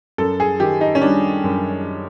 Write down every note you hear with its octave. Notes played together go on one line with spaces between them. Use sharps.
F#2 A4
G#4
D#3 G4
D#4
C#4
G3 D4
F#2